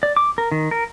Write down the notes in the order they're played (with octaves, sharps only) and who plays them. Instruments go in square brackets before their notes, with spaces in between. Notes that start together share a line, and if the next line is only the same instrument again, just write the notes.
[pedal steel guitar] D5
D6
A#4
D#3
A#4